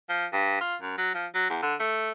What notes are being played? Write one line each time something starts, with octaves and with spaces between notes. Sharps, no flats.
F3
G2
F4
F#2
F#3
F3
F#3
E2
D3
A3